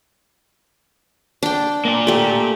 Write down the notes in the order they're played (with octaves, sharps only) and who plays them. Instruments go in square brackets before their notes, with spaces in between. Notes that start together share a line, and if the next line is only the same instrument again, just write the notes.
[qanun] D4 G5
[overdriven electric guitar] A#3 D5
[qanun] A3 G4